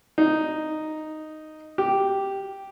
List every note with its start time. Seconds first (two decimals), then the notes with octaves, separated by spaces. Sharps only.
0.18 D#4
1.78 G4